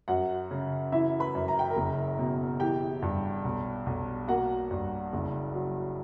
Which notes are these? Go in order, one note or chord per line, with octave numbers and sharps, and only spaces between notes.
F#2 F#4 F#5
C#3
E3 E4 E5
B4 B5
F#2
A#5
G5
A#4 A#5
F#1
B2
E3 G4 G5
G2
B1
B1
A#3 F#4 F#5
G2
F#1
F#3